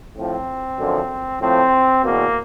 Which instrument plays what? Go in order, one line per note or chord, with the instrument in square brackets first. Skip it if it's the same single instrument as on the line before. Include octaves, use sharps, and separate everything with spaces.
[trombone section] A2 F3 C4
F#2 D3 F3
A2 F3 C4
E2 B2 A#3